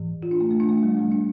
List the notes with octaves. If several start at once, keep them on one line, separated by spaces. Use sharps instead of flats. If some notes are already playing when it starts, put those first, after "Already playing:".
Already playing: A2 E3
F4
D4
A3
A3
D4
A3
G3
A2 F3 A3
D4